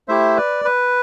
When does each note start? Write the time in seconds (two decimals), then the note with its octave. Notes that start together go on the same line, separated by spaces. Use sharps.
0.08 A3 E4 G4 C5 E5
0.37 B4 D5
0.65 B4